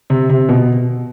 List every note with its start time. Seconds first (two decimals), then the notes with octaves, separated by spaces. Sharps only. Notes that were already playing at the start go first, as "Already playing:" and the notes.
0.10 C3
0.29 C3
0.49 B2